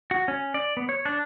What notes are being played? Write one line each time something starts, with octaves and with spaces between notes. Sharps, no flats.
F#4
C#4
D5
B3
C#5
D4